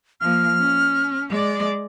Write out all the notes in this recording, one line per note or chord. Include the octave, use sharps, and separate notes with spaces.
F3 A#3 F6
C#4
G#3 D5